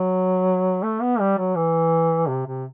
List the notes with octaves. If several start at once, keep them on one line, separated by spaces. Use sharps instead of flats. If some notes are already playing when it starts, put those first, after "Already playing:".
Already playing: F#3
A3
B3
G3
F#3
E3
C3
C3